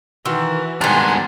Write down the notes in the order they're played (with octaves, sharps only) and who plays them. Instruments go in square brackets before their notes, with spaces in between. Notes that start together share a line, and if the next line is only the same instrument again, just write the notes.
[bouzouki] D#3 [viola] E3 [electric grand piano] F#4 C6 E6
[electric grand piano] G#2 D#3 [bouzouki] G3 A#5 [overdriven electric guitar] B3 D4 [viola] G#5 C6